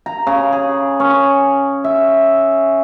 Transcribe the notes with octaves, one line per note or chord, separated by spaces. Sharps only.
A#5
C#3
G#4
C#4
E5